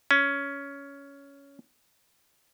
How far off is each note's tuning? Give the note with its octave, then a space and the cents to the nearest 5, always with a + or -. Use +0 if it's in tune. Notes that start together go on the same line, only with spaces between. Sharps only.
C#4 +15